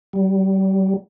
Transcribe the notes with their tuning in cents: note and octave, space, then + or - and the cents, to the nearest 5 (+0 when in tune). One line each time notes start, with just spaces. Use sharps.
G3 -35